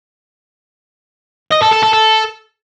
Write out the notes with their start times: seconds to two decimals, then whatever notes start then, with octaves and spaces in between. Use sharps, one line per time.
1.51 D#5
1.62 A4
1.72 A4
1.83 A4
1.93 A4